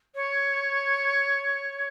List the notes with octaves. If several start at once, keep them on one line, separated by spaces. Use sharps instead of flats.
C#5